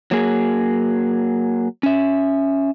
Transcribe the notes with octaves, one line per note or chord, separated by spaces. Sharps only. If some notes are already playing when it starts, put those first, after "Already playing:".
F#3 A#3 G#4
C#4 E5